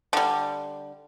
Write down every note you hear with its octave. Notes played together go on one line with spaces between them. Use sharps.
D3 G3